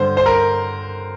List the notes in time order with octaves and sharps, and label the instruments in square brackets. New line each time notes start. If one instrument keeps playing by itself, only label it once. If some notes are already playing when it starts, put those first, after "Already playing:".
Already playing: [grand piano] G2 D3 C5
C5
A#4